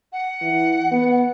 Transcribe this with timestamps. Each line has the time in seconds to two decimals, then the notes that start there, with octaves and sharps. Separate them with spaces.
0.12 F#5
0.42 E3
0.92 B3